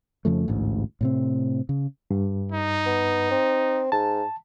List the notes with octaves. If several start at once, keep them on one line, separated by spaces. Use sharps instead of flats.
F2 C#3 F3 A3
A1 D2 G#2
A2 C3 C4
C#3
G2
D#4
B3
C4
G#2 A5